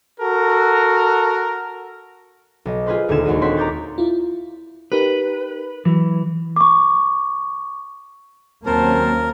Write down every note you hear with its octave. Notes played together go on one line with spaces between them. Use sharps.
F#4 A4 A#4
B1 D#5
F4 G#4 B4 C5
D#1 D2 A#3 D#4 G#6 E7
D#2 G#3 F#4 D#5 D#6
C4 F#4 C#5 C6 B6
A#5 D6 G6 A6
E4 F4
D#4 G4 A#4 B4
E3 F#3
C#6 D6
D#2 F#3 A#3 C4 C#4 A#4 C5 A5